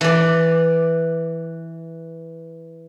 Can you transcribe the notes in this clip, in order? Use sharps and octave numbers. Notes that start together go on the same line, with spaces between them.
E3 D5